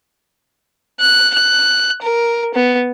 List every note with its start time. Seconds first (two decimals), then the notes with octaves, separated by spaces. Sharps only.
1.01 F#6
1.34 F#6
2.02 A#4
2.54 B3